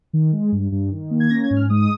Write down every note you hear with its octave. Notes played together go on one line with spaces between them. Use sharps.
D#3
G#3
G2
G2
D#3
A#3
G#6
C#4 A#6
G#6
G#2
F6
G#3 D#6